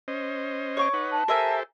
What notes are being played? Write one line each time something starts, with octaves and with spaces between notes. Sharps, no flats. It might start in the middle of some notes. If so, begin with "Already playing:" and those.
C#4 C5 D#5
C#5 C#6 D6
D#4 B4 F#5
A5
G4 A4 A#4 C5 E5 G#5